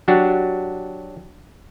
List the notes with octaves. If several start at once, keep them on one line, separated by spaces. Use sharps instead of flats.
F#3 D4 F#4 G4